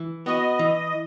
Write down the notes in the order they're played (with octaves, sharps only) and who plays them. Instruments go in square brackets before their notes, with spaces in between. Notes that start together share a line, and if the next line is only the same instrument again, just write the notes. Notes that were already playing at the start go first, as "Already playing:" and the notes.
Already playing: [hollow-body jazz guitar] E3
[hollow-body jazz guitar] B3 F#4 [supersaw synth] D#5
[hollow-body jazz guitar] E3